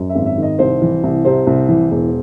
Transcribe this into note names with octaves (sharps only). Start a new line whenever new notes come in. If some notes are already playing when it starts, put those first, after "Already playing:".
Already playing: F#2
E5
G#1
E5
D#3 D#5
C2 C5
E3
C2
C3 C5
C2
E3
E1